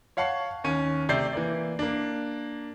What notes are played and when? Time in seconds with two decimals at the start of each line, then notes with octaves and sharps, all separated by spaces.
0.17 C#5 F5 F#5 A5 C#6 C7
0.64 D#2 C#4 D#7
1.09 C3 A3 D5 G6 C7
1.33 E3 A#3 D5
1.79 A#3 D4